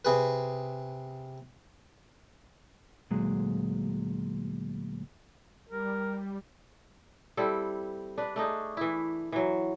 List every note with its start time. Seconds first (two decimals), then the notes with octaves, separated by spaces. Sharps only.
0.05 C3 G#4 B4
3.10 D2 A#2 F#3 G#3
5.69 G3 A#4
7.37 G3 C4 E4 A4
8.18 D4 B4
8.36 A3 D4 D#4 G#4
8.77 E3 E4
9.32 E3 F#3